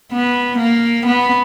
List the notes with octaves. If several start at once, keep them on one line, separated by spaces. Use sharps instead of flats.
B3
A#3
B3